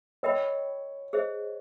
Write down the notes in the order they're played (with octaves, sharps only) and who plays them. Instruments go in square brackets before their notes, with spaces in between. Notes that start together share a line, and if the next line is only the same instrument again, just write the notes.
[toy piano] A#4 D#5 G5 B5 [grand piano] C#5
[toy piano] G#4 C5 D#5